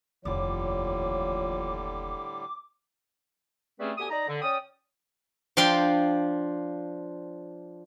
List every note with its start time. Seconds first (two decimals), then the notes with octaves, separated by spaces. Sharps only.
0.25 F1 D#2 A2 D3 F3 G3 C#5 D6
3.79 G3 A3 C4 C#4 G#4 B4
3.97 D2 B3 G4 G#5 D#6
4.09 D#4 D5 A#5
4.27 D3
4.41 C#4 D5 G5 D#6
5.57 F3 D4 F5 G5 C6